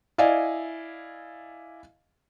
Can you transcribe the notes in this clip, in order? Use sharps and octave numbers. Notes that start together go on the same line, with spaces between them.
E4 D5 D#5 F5 G#5